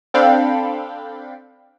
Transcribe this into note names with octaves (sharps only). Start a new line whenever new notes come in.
C4 D4 A4 F5 G5 B5